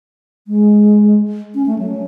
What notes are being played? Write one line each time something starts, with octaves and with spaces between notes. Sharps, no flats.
G#3
C#4
A3
F#3